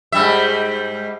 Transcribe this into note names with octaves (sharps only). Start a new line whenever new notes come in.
G#2 G3 E5